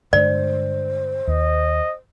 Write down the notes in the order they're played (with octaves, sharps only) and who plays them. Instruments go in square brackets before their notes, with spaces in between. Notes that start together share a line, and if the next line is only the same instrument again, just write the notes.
[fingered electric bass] G2 D3 G#3 [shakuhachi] C5 [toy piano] D5
[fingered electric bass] D#2 [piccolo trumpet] D#5